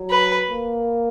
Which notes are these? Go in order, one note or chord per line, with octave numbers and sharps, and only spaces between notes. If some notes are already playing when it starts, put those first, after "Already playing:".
Already playing: F#3
B4
A#3